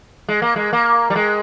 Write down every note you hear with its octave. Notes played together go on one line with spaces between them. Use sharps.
G#3
A#3
G#3
A#3
G3
G#3